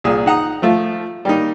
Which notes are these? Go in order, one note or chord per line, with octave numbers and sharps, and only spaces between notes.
C2 A#2 G#4
D#4 F#5 A#5 D#6
F3 A3 F4
G3 A#3 D#4